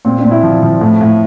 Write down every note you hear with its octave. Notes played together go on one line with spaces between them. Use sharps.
A#2 C4
D4
A#2
E4
F3
F3
A2
A2